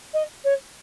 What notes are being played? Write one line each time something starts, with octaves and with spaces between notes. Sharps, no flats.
D#5
C#5